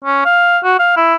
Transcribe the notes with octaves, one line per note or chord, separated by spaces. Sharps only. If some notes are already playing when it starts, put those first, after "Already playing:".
C#4
F5
F#4
F5
E4